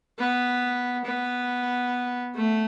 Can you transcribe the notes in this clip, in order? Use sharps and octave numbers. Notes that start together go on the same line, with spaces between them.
B3
B3
A3